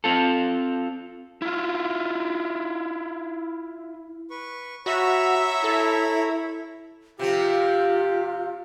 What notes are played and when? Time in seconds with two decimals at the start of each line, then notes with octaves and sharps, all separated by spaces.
0.04 C4 F4 A4
1.42 E4 F4
4.30 B4 C#6
4.86 F#4 C#5 E5 A#5 B5
5.64 E4 A4
7.19 C3 F3 F4 G4